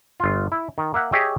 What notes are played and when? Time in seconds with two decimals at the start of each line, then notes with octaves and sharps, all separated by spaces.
0.20 G1 F4
0.52 E4
0.78 D#3
0.94 A#3 E5 F#5
1.12 G4 G#4 C#5 D#5 E5 G5